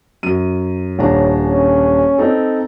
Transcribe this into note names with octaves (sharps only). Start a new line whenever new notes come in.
F#2 D#7
D#1 D4 C#5 A#5
C#4
C4 D#4 A4